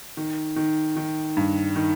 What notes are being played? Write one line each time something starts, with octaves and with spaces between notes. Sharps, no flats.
D#3
D#3
D#3
G2
D#3